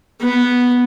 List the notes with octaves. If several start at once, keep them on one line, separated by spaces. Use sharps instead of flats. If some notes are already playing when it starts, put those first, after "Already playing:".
B3